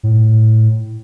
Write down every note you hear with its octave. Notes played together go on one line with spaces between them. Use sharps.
A2